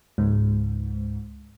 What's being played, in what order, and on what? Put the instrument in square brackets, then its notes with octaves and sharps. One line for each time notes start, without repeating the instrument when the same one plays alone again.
[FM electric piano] C#2 G#2